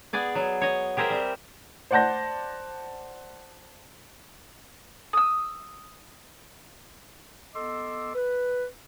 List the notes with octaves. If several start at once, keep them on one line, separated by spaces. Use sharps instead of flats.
B3 G#4 D5 G#5
F#3
C#5 D#5
G4 G#4 A#4 C5 E5
G3 C4
C5 D5 F#5 A5 G6 A#6
D#6 E6
B3 A4 D#5 C6 D6 E6
B4